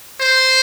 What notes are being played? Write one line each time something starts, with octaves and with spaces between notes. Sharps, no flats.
C5